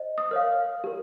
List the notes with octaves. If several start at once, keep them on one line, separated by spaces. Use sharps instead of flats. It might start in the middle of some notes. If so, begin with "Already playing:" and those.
Already playing: C5 D#5
D#6
A#4 C#5 F5 F6
G4 A#4